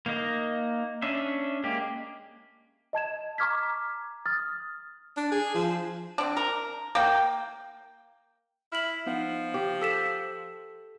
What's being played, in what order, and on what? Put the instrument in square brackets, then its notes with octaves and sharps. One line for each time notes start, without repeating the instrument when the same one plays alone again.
[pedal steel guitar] A#3 D#4 D#5
C#4 D4 E5
G#3 A#3 G4
[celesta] D#5 A5 G#6 E7
A#5 C#6 D6 F6 G#6 B6
D#6 F6 A6
[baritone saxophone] D4
G#4
F3
[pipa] C4 D4
A#4
A#3 G5
[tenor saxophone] E4 [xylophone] F6 B6 F#7
[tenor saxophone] F3 [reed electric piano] B3 D#4 F#5
[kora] G4
[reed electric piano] A4 [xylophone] E6 B6 E7